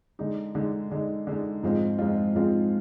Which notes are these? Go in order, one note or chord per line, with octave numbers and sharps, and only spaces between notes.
D3 G#3 D#4
D3 G#3 D#4
D3 G#3 D#4
D3 G#3 D#4
G#2 F3 G#3 C4 F4
G#2 F3 G#3 C4 F4
G#2 F3 G#3 C4 F4